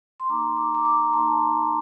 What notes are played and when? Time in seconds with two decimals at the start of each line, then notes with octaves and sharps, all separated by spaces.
0.20 C6
0.29 A#3 D#4 A#5 D6
0.57 D6
0.75 A#5 D6
0.85 A#5 D6
1.13 A#3 D#4 A5 C6